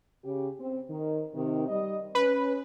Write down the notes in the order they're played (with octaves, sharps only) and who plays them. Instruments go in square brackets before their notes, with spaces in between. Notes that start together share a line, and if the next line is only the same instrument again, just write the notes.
[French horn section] C#3 G4
C4
D#3
C3 D#3
G3 D#5
[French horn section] C#4 [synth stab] B4